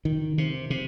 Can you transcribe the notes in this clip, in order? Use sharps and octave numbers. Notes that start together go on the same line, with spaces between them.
D#3
C3
C3